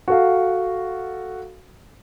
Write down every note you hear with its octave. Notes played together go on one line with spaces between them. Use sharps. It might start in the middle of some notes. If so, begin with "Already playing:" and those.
F#4 A4 F5